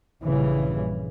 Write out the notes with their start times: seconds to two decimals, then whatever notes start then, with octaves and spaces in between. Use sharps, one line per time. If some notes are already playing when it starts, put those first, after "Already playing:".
0.21 A#1 G2 C#3 E3 G3